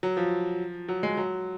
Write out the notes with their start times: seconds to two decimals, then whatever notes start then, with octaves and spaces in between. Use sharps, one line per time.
0.03 F#3
0.17 F3
0.89 F#3
1.03 G#3
1.17 F#3